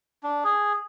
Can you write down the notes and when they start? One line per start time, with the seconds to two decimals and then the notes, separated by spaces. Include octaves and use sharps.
0.23 D4
0.44 G#4